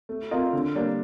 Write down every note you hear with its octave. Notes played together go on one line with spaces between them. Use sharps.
A3
C4 F4 A#4 D#5
D3
G3 A#3 D4